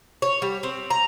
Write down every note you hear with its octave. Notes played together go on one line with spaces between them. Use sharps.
C#5
G3
C4
A#5